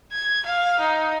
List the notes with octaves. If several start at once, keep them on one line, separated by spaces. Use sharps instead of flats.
G#6
F5
D#4